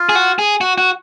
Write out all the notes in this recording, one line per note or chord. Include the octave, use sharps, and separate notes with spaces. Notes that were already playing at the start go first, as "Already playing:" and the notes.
Already playing: F4
G#4
F#4
G#4
F#4
F#4